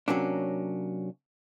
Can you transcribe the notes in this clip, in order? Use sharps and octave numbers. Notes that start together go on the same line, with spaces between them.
C3 F#3 A#3 C#4 D4